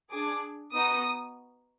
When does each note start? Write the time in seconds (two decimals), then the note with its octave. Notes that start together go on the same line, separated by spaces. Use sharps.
0.10 D4 G#4 D6
0.72 B3 D#4 F#4 D#6